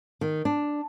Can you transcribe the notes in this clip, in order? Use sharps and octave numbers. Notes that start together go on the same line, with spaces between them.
D#3
D4